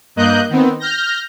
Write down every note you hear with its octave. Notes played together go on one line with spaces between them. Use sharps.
G2 A#3 D#5 F#6 G6
D#3 B3 C4
F6 G6 A#6